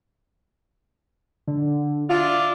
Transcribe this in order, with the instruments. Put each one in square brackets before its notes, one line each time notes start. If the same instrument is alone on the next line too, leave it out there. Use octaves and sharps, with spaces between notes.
[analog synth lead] D3
[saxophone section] D4 E4 F4 [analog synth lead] D5